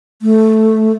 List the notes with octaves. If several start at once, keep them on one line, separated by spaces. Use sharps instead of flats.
A3